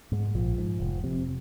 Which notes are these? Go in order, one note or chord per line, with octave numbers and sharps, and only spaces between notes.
G#2 G#3
A#1 F3
G#2
F1
F2 C3